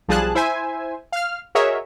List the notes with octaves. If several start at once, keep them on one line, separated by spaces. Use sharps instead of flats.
B1 F3 G3 G#4 A5 F#6
E4 C5 E5 G#5
F5 F6
F#4 G#4 A#4 C#5 D#5 E5